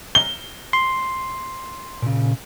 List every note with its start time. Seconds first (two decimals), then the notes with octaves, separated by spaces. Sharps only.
0.15 G7
0.73 C6
2.02 A#2 C#3